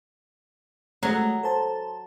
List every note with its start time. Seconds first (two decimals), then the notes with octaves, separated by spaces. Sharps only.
1.03 F#3 G#3 A3
1.43 A4 C5 A5